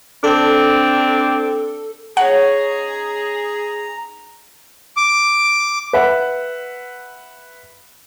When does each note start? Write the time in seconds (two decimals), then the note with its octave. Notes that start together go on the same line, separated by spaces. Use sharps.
0.24 C4 D4 A4
2.17 C#4 D#4 G#4 C#5 F#5 A#5
4.97 D6
5.93 B4 E5 F#5